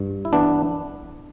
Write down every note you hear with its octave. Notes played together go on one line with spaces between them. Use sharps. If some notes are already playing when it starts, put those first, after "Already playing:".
Already playing: G2
E4
E3 B3 D4